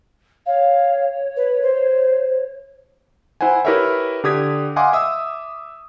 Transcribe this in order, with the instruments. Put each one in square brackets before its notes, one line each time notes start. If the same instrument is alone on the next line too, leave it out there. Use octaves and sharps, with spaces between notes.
[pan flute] C#5 [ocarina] F5
[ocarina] B4
C5
[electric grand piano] E4 C5 F#5 G#5
E4 G4 A#4 B4 C#5 E5
D3 G4 D#6 G#6 B6
D#5 F5 F#5 G#5 C6 D6
E5 D#6 E6